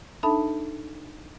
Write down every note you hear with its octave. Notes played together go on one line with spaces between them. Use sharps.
D4 D#4 A4 E5 A5 B5